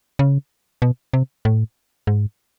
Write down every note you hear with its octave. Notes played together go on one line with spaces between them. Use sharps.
C#3
B2
C3
A2
G#2